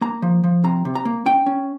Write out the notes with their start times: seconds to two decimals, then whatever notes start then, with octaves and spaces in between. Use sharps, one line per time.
0.01 A#3 A#5
0.22 F3
0.44 F3
0.64 C3 A#5
0.85 C3
0.95 A#5
1.05 A#3
1.26 C#4 G5
1.46 C#4